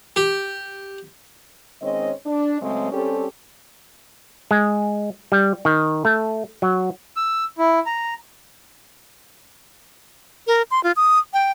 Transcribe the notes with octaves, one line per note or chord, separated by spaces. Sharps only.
G4
D#3 G#3 C4 C#4 C#5 D#5
D4
C#3 F#3 G#3 A3 C4
G3 C4 C#4 G4 A4
G#3
G3
D#3
A3
F#3
E6
E4
A#5
A#4
C6
F4
D#6
G5